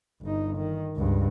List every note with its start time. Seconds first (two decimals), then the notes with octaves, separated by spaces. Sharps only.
0.22 G1 D#4
0.56 D#3
0.96 C#2 G2